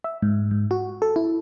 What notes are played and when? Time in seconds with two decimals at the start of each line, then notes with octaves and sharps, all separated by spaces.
0.04 E5
0.22 G#2
0.51 G#2
0.71 F#4
1.02 A4
1.16 E4